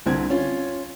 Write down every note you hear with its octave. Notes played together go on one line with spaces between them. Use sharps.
C2 D3 C4 G#6
C#4 F4